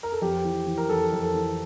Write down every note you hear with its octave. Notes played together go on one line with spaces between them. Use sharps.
A#4
A4
F2 G4
E3
E3
A#4
F2 A4
F2 A#4
A4
E3